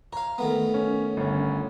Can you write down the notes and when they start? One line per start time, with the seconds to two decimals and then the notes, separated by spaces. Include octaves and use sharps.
0.13 C#5 F5 A#5
0.38 D#3 A3 B3
0.74 C#4
1.17 G1 C#4